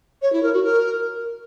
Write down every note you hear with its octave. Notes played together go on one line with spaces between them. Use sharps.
C#5
E4
A#4
F#4
A#4